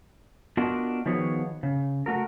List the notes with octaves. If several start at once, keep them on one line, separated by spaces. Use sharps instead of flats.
B3 D4 F4 F#4 A#4 D#5
D#3 F3 B3 F#4 G#4 C#5
C#3
A3 F#4 A#4